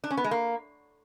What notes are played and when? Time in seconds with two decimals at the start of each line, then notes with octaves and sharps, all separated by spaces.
0.04 D4
0.11 C#4
0.17 B3
0.24 G#3
0.31 A#3